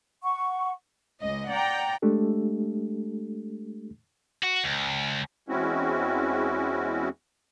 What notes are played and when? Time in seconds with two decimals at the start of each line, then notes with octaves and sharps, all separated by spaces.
0.23 F#5 C#6
1.21 C#2 D#5
1.51 D5 F#5 G5 A#5
2.02 G#3 A3 D4 G4 A4
4.43 F#4
4.64 C#2
5.49 E2 G#3 C4 C#4 E4 F#4